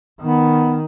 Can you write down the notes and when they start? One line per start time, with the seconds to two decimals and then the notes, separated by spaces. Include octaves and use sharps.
0.21 D#3 B3